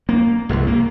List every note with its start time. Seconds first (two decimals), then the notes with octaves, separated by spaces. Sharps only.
0.09 A#3
0.49 E1 C2
0.67 A#3